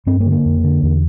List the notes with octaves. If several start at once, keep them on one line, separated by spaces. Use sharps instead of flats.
G2 C4
A#3
D3
A#3
F2
D3
E2